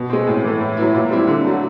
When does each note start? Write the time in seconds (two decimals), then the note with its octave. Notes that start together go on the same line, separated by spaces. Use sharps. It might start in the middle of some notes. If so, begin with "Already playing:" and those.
Already playing: B2
0.10 G#3 C4
0.27 A2
0.44 E3 A3
0.61 A2
0.77 F#3 B3 E4
0.94 A#2
1.10 G3 C4 E4
1.28 D3
1.44 F#3 A3